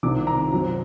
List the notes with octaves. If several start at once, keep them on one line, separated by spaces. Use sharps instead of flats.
C2 C3 D#3 D6
A#5
F#2 F#3 C4